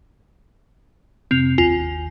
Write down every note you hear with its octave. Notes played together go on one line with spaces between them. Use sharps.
F2 C3 C4 F7
G1 D#2 F4 G#5